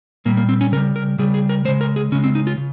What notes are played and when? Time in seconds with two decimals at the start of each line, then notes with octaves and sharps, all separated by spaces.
0.25 A#2 G3 A#3
0.37 A#3
0.49 C4
0.61 C#4
0.72 C#3 A#4
0.77 G3
0.96 A#4
1.18 C#3 G3 G#4
1.34 G#4
1.49 A#4
1.65 G#3 C5
1.68 C#3
1.81 A#4
1.96 G#4
2.12 C#3 G#3 C#4
2.24 C4
2.35 D#4
2.47 F4
2.58 C#3